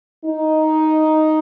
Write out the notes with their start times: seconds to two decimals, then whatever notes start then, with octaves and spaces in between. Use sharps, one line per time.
0.24 D#4